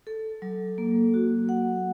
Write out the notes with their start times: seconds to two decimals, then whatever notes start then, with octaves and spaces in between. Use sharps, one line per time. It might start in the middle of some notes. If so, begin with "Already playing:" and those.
0.07 A4
0.42 F#3
0.78 A#3
1.14 F#4
1.49 F#5